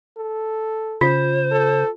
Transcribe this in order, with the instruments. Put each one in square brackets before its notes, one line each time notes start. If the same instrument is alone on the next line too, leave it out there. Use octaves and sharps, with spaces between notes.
[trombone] A4
[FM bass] C#3 [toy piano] F4 [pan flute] C5
[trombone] A4